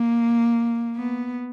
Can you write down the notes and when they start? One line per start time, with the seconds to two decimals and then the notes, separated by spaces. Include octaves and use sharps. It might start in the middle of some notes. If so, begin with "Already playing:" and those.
Already playing: A#3
0.96 B3